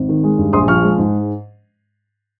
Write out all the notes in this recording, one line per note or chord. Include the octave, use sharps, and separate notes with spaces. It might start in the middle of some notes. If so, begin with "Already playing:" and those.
Already playing: G#1
D#3
G#3
G2
A#1 C6 D#6
F3 C#6 F6
G#3
G#2